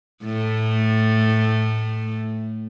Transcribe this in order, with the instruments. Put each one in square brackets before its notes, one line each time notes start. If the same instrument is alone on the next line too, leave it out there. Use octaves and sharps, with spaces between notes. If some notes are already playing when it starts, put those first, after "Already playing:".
[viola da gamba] A2 A3